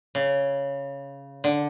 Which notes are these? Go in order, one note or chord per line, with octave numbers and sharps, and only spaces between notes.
C#3
D3